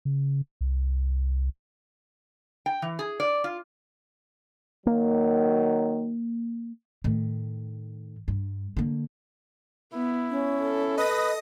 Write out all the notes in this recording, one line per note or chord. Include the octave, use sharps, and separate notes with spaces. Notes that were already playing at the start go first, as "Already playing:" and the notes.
C#3
C2
G5
E3
G#4
D5
F4
D#3 F#3 A#3
A2 D#3
G2
D3 A#3
B3 E4
C#4
A4
B4 D#5 D#6 A#6